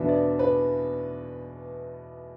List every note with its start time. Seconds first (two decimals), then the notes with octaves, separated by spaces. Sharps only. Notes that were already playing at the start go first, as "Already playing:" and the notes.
Already playing: E2 B2 B3 D4 E5
0.09 D5
0.39 B4